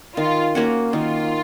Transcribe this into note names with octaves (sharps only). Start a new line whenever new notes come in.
D#3 F4
A#3 C#4 F#4
D#3 F4